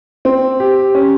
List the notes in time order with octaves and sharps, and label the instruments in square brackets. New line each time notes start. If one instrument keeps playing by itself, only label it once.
[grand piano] C4
G4
C#4